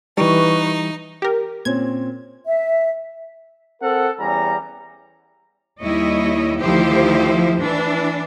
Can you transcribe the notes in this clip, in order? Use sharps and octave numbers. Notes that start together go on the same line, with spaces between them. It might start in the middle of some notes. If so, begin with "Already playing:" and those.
E3 G3 D#4 B4 C#6
G4 A#4
A#2 C4 C#4 G#6
E5
C4 A4 A#4 F#5
E2 G3 C#4 A#5
D#2 G3 E4 C#5 D#5
D2 D#3 F3 E4 G4 C5
E3 D4